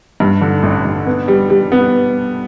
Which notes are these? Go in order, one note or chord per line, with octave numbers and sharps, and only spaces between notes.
G2
D3
A1
G2
B3
G3
G3
B3